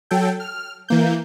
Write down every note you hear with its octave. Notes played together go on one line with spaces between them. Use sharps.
F#3 A4 G5
F6
E3 A#3 G6